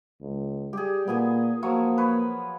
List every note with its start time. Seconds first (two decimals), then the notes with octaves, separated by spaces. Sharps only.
0.21 C#2
0.73 G3 G4 G#4
1.08 A#2 B3 G#4 G#5
1.63 F3 F#3 A#3 C#6
1.98 B4 C#5